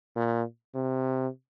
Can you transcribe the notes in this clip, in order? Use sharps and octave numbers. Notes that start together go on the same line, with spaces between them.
A#2
C3